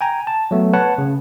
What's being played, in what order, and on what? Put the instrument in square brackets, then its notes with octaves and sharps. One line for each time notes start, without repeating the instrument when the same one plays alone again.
[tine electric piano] G5 G#5 A#5
A5
F#3 A3 B3
B4 C#5 F#5 A5
C#3